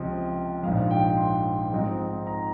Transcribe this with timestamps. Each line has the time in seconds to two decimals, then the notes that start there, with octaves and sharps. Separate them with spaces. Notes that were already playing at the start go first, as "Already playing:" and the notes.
Already playing: C#2 C3 F3 C4 D#5
0.63 A#1 G#2 F3 F5
0.91 G5
1.17 C6
1.73 G#2 F3 C4 D#4
2.27 A#5